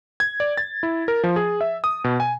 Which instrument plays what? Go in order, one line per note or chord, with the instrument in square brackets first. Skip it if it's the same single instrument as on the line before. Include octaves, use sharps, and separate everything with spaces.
[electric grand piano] G#6
D5
A6
E4
A#4
F3
G#4
E5
D#6
B2
G#5